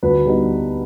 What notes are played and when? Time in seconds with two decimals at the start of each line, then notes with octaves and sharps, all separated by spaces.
0.03 D2 B4
0.25 D3 G3 B3 D#4